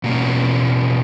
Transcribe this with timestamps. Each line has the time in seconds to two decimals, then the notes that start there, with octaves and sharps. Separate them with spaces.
0.04 B2 A#3 C#4